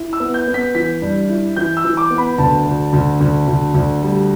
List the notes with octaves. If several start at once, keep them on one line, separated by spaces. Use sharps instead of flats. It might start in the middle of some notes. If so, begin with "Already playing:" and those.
Already playing: E4
E6
B3
G6
B3
B6
E3 B6
G2
E4
E3 G6
E6
E3
D6
B3
B5
D2 A5
D2
D2
D2
D2
D2
G3